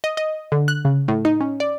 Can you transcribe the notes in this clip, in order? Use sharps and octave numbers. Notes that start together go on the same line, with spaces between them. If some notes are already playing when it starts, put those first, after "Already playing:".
D#5
D#5
D3
F#6
C#3
A2
D#4
C#4
D5